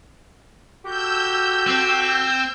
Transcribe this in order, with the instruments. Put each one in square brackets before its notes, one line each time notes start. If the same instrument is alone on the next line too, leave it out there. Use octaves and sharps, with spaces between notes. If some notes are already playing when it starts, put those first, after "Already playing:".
[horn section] F#4 G4 A4 [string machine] E6 G6
[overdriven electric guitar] C4